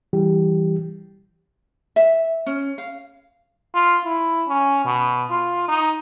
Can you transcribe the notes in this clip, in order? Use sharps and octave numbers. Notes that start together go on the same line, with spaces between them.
E3 G3 G4
E5
C#4
F5
F4
E4
C#4
B2
F4
D#4